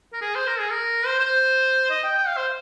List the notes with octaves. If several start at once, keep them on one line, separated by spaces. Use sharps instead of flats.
A#4
G#4
C5
A#4
G#4
A#4
C5
C5
D#5
G5
G5
F5
C5